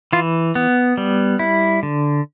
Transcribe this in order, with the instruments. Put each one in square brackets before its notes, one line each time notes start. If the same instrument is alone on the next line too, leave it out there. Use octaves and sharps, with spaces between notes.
[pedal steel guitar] E3 F4
B3
G3
E4
D3